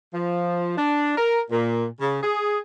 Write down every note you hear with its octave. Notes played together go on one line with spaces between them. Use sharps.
F3
D4
A#4
A#2
C#3
G#4